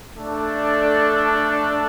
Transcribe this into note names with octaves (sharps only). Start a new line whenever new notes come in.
A3 D4 A4 D5